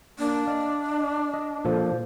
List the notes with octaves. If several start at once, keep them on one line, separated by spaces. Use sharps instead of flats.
A#3 D4
D5 D#5 F5
D#5
A#2 F3 A4 C5